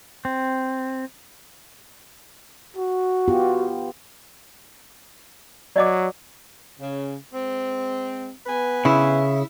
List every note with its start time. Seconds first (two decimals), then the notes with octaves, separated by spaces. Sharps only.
0.25 C4
2.77 F#4
3.28 B3 F4 G4
5.76 F#3 D5 D#5 D6
6.80 C#3
7.34 G#3 C4
8.46 B3 B4 G#5
8.85 C#3 E4